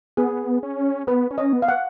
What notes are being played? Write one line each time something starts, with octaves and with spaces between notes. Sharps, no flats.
B3 G#4
C#4
B3 B4
C#4
D#5
B3
F5
F#5